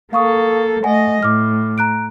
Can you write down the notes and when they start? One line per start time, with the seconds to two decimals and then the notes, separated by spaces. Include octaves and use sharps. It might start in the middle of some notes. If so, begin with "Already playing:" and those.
0.13 A#3 A4 F5 C#6 D#6
0.84 A3 D#5 F#5 G#5
1.23 A2 D6 F6
1.78 A#5 F#6 D7